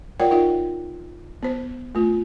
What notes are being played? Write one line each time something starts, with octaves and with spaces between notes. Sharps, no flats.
F4 A#4 C#5 D5 F#5 G5
D#4 F4 E5
B3 C5
A3 F4